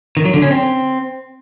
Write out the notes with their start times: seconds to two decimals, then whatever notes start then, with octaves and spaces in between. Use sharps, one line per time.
0.17 D#3
0.25 F#3
0.34 D3
0.42 C#4
0.51 C4